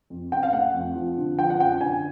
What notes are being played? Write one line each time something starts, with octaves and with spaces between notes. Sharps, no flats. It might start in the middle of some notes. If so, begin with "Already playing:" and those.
F2
C#3 G5
F5
A3 F#5
F2
F3
D3
F3 G5
F#5
F#2 G5
D3 G#5